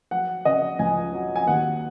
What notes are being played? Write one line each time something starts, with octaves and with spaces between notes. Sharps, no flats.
F#3 F#5
C#3 D#5
C#2 G#5
F#3
G#5
D#2 F#5